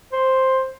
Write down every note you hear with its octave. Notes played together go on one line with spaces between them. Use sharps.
C5